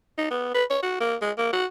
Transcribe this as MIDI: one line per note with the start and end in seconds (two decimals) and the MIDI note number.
0.18 0.30 63
0.30 0.51 59
0.54 0.64 71
0.70 0.81 73
0.82 0.97 66
1.00 1.15 58
1.22 1.31 56
1.37 1.52 58
1.53 1.65 66